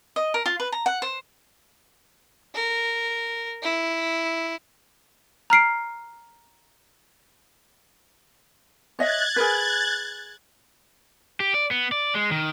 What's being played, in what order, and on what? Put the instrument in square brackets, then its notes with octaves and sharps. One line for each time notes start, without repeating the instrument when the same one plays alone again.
[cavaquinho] D#5
A#4
F4
B4
A#5
F#5
C5
[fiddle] A#4
E4
[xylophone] A#5 F6 C7 D7
[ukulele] C#5 D#5 E5 [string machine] F#6 G#6 A6
[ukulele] G#4 A#4 B4
[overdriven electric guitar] G4
D5
B3
D5
G#3
D#3